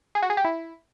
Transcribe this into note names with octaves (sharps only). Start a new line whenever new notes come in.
G#4
F#4
G#4
G4
E4